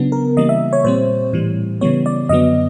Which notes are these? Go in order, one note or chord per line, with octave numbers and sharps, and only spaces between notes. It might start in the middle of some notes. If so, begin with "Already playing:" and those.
Already playing: C#3 F#3 B3 D4
A#4
C#3 E3 G3 A#3 D#5
E5
C#5
A#2 G3 C4 C5
A2 E3 G3
C#3 E3 G3 B3 C#5
D5
F#2 D3 F#3 B3 D#5